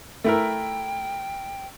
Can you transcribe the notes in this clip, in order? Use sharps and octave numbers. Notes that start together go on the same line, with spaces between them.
A3 E4 A#4 G5